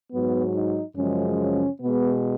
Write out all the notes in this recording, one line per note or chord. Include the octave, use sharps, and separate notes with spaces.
G#2 F#3 B3
D#4
F#2 C#3 F3 G#3 C#4
C#4
B2 G#3 B3